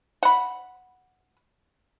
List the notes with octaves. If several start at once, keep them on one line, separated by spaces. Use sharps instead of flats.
F#5 B5